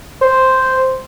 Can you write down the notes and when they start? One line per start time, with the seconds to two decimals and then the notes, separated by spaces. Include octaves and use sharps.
0.21 C5